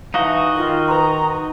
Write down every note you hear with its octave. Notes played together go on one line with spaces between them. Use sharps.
E3 D#4 F#4 D#5 F5 A5
D#3 F4
B4 A#5 C6